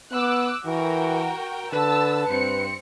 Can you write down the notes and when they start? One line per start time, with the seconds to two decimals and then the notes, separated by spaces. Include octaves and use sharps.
0.12 B3 D6 E6 F#6
0.66 E3 F#4 A#4 G5
1.73 D3 B4 A5 E6
2.28 G2 C4 C#7